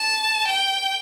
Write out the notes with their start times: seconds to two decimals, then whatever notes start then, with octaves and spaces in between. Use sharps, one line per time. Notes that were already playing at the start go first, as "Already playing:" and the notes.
Already playing: A5
0.47 G5